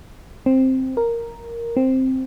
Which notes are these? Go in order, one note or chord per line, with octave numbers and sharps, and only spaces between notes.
C4
A#4
C4